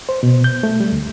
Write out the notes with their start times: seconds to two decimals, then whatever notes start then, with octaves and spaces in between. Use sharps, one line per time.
0.09 C5
0.23 B2
0.44 G6
0.63 A3
0.80 G3
0.92 D2